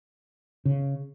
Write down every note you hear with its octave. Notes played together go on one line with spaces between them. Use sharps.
C#3